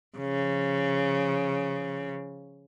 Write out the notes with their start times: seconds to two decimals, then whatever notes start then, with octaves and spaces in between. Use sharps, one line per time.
0.18 C#3 F3